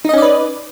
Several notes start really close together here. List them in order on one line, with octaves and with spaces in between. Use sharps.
D#4 D#5 C#4 D5 B4